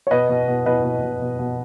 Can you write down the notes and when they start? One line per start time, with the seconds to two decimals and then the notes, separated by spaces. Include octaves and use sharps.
0.07 C#5
0.11 B2 B4 D#5
0.29 B2
0.48 B2
0.66 B2 B4 D#5
0.84 B2
1.02 B2
1.21 B2
1.39 B2